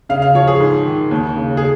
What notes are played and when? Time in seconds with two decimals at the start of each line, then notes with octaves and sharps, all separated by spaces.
0.09 C#3 F5
0.22 F5
0.35 F3 C#5
0.48 G#4
0.61 G#2
0.86 D#3
1.11 D#2
1.36 C#3
1.57 G#4